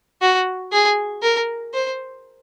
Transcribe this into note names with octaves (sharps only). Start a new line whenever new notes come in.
F#4
G#4
A#4
C5